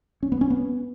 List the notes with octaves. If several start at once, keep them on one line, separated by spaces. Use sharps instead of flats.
C#4
B3
C#4
B3